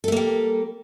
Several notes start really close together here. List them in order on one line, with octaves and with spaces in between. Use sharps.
A4 A3 A#3 G3